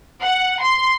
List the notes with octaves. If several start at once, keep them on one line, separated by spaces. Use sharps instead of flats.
F#5
C6